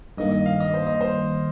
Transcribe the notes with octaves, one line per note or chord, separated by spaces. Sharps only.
G2 D#3 A#3 D#5
D#5
F5
D#5
C5
D#5
C5